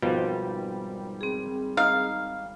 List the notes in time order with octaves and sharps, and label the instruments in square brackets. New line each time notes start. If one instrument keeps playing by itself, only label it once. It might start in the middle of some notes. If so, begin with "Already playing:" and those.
[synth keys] G#1 G3 [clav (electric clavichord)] B2 F3
[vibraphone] C4 G#4
[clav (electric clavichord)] D#4 [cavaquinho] F5